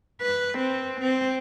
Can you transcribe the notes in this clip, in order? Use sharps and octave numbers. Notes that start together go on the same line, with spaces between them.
B4
C4
C4